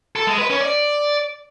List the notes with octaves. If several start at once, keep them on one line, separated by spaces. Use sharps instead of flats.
A4
G#3
B4
C#4
D5